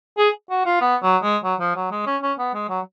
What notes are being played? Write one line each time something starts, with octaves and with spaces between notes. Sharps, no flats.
G#4
F#4
F4
B3
F#3
G#3
F#3
F3
F#3
G#3
C#4
C#4
B3
G#3
F#3